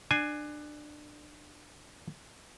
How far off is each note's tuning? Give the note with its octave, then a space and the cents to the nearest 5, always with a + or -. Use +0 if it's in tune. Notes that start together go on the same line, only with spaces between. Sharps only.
D4 +20 G#5 +0